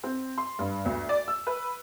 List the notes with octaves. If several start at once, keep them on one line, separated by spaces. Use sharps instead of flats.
C4
C6
G2
D2
D5
E6
B4